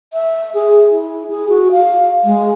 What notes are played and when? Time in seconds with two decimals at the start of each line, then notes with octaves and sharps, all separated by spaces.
0.13 E5
0.54 G#4
0.91 E4
1.30 G#4
1.49 F#4
1.72 F5
2.24 G#3